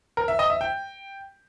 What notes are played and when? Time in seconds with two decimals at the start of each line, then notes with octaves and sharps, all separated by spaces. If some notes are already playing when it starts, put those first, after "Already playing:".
0.17 A#4
0.28 E5
0.39 D#5
0.50 E5
0.61 G5